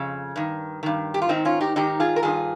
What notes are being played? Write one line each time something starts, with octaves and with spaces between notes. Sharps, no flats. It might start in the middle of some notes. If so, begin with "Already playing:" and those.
Already playing: F2 C#3
G2 D#3
G2 D#3
G4
F4
G#2 D#3 C4 D#4
C#4 F4
D#4 G4
G#2 D#3 D#4 G4
F4 G#4
A#4
G2 D#3 F4 G#4